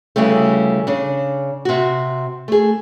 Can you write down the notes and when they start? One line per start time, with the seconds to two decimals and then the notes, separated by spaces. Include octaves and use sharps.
0.16 D2 C#3 E3 G3 A3
0.87 C#3 D4
1.65 C3 F#4
2.48 A3 G#4